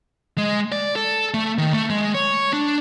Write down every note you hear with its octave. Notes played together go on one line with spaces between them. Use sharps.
G#3
D5
A4
A3
D#3
A3
G#3
C#5
D4